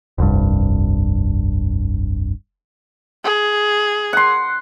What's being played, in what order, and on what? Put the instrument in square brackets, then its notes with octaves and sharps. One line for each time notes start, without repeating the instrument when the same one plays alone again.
[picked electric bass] F1 C2 G2
[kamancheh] G#4
[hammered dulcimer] F#5 C6